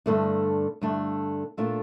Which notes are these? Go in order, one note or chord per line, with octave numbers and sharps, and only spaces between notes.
G2 D3 A3 D4
G2 D3 A3 D4
A#2 A3 D4 F4 A4